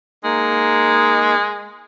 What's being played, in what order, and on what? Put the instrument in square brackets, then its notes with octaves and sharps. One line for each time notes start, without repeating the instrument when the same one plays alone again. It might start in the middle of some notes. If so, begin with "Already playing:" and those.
[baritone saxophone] G#3 [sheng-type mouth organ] A#3 D#4